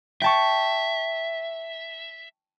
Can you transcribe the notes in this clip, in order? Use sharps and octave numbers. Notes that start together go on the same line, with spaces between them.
E5 G5 A5 C#6